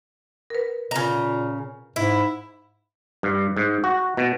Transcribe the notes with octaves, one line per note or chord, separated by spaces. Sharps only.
A#4 B4
A#2 C#3 A#5
G#2 E4
G2
G#2
F#4
B2